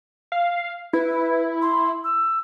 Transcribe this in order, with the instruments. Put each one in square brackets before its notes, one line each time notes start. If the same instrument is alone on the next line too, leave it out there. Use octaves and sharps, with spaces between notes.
[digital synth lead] F5
[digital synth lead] E4 [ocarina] B4
[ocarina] C6
E6